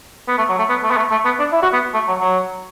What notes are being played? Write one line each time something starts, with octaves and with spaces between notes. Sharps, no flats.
B3
A3
F#3
A3
B3
A3
B3
A3
A3
B3
D4
E4
F#4
B3
A3
F#3
F#3